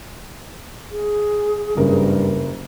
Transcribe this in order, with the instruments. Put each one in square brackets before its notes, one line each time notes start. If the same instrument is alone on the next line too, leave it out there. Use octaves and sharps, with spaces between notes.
[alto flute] G#4
[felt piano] F#1 A#4 [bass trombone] G2